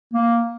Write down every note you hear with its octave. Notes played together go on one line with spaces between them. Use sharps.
A#3